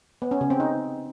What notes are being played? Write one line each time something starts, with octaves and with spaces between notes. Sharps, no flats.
B3
C#4
C#3
C4
D#4